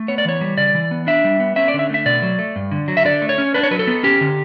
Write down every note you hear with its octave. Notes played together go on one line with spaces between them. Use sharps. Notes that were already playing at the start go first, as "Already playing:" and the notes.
Already playing: A3
B3 C#5
D5
E3 C#5
G3
C#3 D5
E3
B3
D4 E5
G3
B3
C#4 E5
D5
D3
E5
A3 E5
B2 D5
F#3
A3
G2
D3
F#3
E5
D3 D5
A3
C#5
C#4
D4 B4
C#5
F#3 B4
A4
B3
C#4 G4
D3